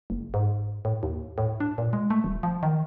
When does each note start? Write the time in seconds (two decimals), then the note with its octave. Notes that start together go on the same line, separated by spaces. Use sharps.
0.10 F#1
0.34 G#2
0.85 A2
1.03 D#2
1.38 A2
1.60 D4
1.78 A#2
1.93 G#3
2.10 A3
2.24 D#1
2.43 F3
2.63 D#3